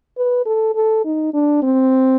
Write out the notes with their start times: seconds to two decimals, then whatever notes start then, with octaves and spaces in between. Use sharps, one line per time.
0.18 B4
0.46 A4
0.75 A4
1.05 D#4
1.34 D4
1.63 C4